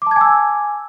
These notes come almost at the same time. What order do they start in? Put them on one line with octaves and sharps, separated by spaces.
D6 A5 G#6 G#5 E6